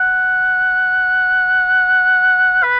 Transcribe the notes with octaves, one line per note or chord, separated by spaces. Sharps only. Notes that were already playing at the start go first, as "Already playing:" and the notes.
Already playing: F#5
B4